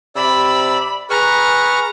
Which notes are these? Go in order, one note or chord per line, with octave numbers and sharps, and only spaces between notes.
C3 D5 B5 E6
G#4 B4 A#5 C#6 F6